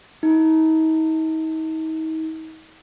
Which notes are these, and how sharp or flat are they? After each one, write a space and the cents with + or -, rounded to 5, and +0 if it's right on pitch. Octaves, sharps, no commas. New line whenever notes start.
D#4 +40